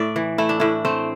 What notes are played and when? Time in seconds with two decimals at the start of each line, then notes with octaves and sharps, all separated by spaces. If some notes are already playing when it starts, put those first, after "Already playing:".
Already playing: A2 D5 E5
0.16 E3
0.38 A3 E4
0.49 D4
0.60 A2 E4
0.85 A3 C4